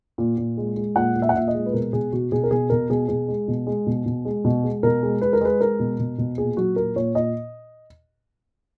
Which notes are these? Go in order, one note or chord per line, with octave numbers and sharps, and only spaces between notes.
A#2
A#2
G#3
G#3
A#2 F#5
A#2
E5
F#5
A#2 E5
D#5
G#3
B4
B2 A#4
B2 G#4
B2 F#4
B2 G#4
A#4
B2 G#4
B2 A#4
B2 G#4
B2 G#4
G#3
B2
G#3
B2
B2
G#3
B2
G#3
B2 A#4
G#3
G#3 B4
A#4
G#3 B4
G#3 A#4
B2
B2
B2
A#2 G#4
F#3 F#4
A#2 A#4
A#2 C#5
A#2 D#5